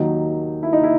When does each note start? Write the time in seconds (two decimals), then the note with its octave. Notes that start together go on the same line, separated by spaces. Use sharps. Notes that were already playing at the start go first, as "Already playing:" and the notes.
Already playing: D#2 D#3 F#3 D#4
0.63 E4
0.73 D#4
0.83 E4